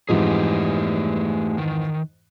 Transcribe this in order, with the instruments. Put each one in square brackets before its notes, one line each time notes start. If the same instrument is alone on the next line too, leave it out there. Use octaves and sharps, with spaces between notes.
[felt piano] F2 G#2 E3 [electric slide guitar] A3 G4 G#4
[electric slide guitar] D#3